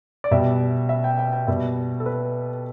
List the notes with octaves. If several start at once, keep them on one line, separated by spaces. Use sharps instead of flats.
D5
B2 G3 E5
E5
G5
G5
G5
B2 G3 E5
A4
B4